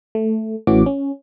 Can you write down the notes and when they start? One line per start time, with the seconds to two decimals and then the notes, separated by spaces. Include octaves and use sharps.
0.15 A3
0.67 A1 A2 E3 C#4 F#4 D6
0.86 C#4